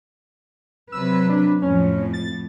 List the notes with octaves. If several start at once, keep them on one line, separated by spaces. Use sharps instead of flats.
C3 F#3 B4 E6
D4
F2 A2 C#4
A6